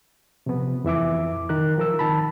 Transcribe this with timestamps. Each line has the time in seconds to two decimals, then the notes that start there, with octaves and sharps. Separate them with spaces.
0.46 C3 F3 B3
0.84 F2 E3 E5 D6
1.49 D#3 A#4 F#6
1.78 F3 A#4 E6
1.99 D#3 A5 B5